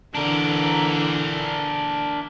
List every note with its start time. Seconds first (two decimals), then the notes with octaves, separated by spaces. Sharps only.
0.15 D3 E3 D4 A#4